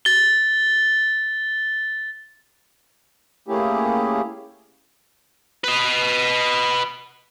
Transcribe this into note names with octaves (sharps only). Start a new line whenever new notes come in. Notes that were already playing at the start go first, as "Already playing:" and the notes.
A6 G7
A3 A#3 C#4 E4 G4 G#4
B4 D#5